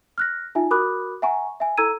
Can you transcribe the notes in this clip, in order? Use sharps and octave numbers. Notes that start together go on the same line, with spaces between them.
F6 F#6 A#6
D#4 F4 E5 G#5
F#4 A#4 B5 D6 D#6 F#6
E5 F#5 G#5 A#5 C#6
E5 G#5
E4 A4 A#5 E6 G#6 D#7